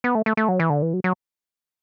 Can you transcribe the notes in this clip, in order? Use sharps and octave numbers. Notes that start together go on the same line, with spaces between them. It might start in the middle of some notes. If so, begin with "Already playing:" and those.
B3
A3
A3
A3
F#3
E3
D3
E3
F#3
F#3